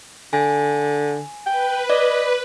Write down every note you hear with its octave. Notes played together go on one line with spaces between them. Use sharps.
D3 G#5
B4 G5
D5 D#5